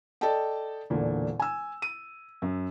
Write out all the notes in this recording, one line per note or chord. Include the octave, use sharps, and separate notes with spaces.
A4 D5 D#5 G5 A5
E1 A#2 D3
G#5 E6
D#7
F#2